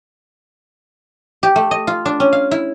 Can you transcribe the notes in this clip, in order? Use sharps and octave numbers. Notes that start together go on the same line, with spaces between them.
G4
A3
D#5
F4
D4
C#4
F5
E4